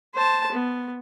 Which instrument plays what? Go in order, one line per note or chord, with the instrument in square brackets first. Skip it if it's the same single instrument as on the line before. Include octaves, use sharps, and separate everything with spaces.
[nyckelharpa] C5 A5
B3